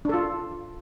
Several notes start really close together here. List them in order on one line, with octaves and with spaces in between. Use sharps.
D4 A4 F4